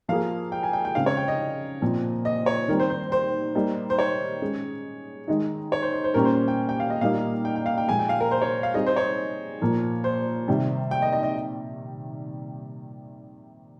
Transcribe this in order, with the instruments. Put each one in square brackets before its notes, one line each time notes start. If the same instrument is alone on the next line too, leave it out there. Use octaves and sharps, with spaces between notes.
[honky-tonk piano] F3 A#3 F4 G#4 [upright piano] F5
[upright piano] G5
G#5
G5
G5
[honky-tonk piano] C#3 G#3 C4 D#4 [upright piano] F5
[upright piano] C#5
G5
D#5
[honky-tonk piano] A#2 F3 C4
[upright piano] D#5
C#5
[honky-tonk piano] D#3 G3 C4 [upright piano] A#4
[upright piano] C5
C5
C5
[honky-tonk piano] G3 A#3 D#4
[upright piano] C5
C#5
[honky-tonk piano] G#3 C#4 G#4
D#3 G#3 D#4
[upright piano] C#5
C5
C5
C5
[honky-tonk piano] A#2 G3 A#3 C#4 G4 [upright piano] A#4
[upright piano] C5
G5
G5
F5
D#5
[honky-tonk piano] A#2 G3 A#3 D#4 G4 [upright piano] F5
[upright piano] G5
G5
F5
G5
[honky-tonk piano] A#2 F3 G#3 [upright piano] G#5
[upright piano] G5
F5
A#4
C5
C#5
F5
[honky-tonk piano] G3 C4 D#4 G#4 [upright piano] D#5
[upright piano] C5
C#5
[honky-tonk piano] A#2 F3 A#3
[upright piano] C5
[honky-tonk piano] C3 D#3 G3
[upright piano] G5
D#5
D#5
D#5